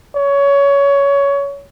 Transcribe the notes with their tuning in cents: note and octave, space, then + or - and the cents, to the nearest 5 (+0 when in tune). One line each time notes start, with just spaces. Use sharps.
C#5 +20